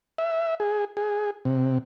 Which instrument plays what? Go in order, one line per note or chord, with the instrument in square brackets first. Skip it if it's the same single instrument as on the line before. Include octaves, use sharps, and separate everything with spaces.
[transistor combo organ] E5
G#4
G#4
C3